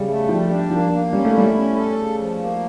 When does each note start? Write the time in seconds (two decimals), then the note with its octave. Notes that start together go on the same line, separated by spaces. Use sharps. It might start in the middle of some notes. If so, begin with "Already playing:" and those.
Already playing: C#3 G3
0.08 A3
0.28 F3 G3
0.49 D4
0.70 F3 A#3
0.92 A#3
1.13 G3 C#4
1.25 A3
1.34 G3 E4
1.55 C#4
1.76 A4
1.97 C#3
2.18 F3
2.39 A#3